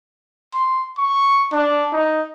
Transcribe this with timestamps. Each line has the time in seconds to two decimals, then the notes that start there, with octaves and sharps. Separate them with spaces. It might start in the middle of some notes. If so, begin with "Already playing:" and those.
0.54 C6
0.98 C#6
1.52 D4
1.93 D#4